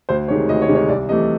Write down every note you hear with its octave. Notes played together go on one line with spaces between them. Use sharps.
D2 C5
C3 D#3 G#3 C#5
D2 D#5
C#5
C3 D#3 G#3
C#5
C2 D5
C3 E3 A3 D#5